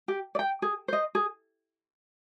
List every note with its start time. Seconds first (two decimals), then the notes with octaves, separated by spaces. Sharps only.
0.08 G4
0.35 D5
0.39 G5
0.62 G#4
0.88 C5 D#5
1.15 G#4